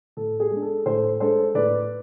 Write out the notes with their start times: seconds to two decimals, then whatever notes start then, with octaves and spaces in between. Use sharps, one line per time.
0.17 A2 A4
0.40 G#4
0.51 G#3 D4
0.62 A4
0.85 A2 A4 C5
1.20 G#3 D4 A4 C5
1.55 A2 B4 D5